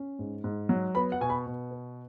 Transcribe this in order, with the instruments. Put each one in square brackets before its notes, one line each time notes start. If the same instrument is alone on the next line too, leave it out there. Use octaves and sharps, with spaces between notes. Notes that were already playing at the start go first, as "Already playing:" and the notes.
Already playing: [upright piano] C#4
G#2
G#2
F#3
B3 B5
F#5
B2 G#5
B5
B2
B3